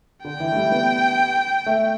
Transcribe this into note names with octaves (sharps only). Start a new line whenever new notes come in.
D3 G5
E3
A3
G3
B3
A3